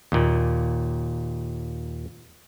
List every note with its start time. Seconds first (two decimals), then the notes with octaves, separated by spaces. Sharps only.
0.12 D#2 A#2